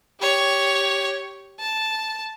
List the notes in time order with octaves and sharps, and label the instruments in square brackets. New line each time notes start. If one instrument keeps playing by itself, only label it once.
[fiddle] G4 C#5
A5